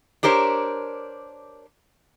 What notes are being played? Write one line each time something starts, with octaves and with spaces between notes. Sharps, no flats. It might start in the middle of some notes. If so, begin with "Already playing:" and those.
D4 G4 A#4 C5 C#5